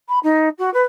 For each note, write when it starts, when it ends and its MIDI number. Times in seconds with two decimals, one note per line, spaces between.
0.09 0.19 83
0.23 0.49 63
0.59 0.72 66
0.74 0.83 71